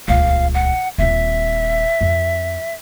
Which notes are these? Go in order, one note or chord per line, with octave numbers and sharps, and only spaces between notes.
D#1 C#2 F5
F#5
D#1 C4 E5
F2